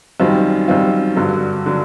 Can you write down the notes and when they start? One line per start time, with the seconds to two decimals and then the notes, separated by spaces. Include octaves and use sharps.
0.20 F#2 D#3 G3 C4 F4
0.68 F#2 D#3 G3 C4 F4
1.16 G2 D3 F#3
1.66 D3 F#3